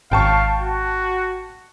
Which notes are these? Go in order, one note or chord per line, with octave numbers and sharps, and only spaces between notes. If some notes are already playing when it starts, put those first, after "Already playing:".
G#1 F5 G5 A5 C#6
F#4